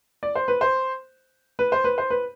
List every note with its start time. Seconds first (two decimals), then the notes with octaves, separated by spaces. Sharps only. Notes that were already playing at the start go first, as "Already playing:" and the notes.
0.23 D5
0.35 C5
0.48 B4
0.61 C5
1.59 B4
1.72 C5
1.84 B4
1.98 C5
2.10 B4